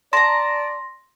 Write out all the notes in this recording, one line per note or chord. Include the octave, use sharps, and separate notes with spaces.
D5 A5 A#5 C6 A#6